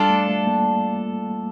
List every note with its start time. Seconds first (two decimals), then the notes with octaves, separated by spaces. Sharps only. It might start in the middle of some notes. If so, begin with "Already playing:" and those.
Already playing: G3 D4 F4 A4 D5
0.10 A3
0.29 A3
0.47 A#3